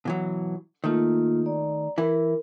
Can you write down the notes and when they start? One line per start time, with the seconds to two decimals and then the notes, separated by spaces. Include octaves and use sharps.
0.05 B2 E3 F#3
0.84 D#3 A3 A#3 F4
1.46 D5 A#5
1.98 E3 E4 A#4